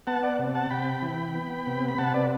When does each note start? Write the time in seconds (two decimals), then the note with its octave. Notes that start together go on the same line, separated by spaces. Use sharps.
0.07 B3 F#5 A5
0.23 D5 F#5
0.39 C3
0.55 F#5 A5
0.70 C3 G5 B5
1.02 E3
1.35 B3
1.67 C3
1.88 B5
1.98 C3 F#5 A5
2.14 B4 D5